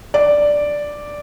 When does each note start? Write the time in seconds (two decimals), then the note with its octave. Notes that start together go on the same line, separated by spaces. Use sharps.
0.14 D5